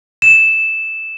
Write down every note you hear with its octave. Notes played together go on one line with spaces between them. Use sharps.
E7